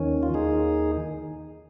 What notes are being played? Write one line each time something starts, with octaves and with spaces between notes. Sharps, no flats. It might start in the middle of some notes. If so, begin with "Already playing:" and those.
Already playing: D#2 D#3 C#4
F4
D#2 D#3 D#4 G#4